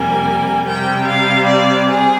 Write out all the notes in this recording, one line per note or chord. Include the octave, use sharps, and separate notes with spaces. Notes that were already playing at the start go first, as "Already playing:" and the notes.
Already playing: F2 C3 G3 A#3 G#5
C3 G3 C4 G5
F5
D5
G#4